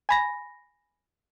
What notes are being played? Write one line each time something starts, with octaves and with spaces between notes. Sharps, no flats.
G#5 B5 A#6